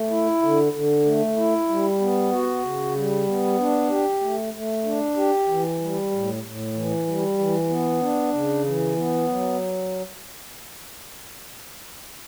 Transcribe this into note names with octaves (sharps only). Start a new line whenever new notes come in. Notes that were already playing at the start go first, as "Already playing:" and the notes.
Already playing: A3
E4
D3
D3
A3
E4
G3
B3
F#4
C#3
G3
B3
D4
G4
A3
A3
D4
G4
E3
G3
A2
A2
E3
G3
E3
B3
D4
C#3
E3
B3
F#3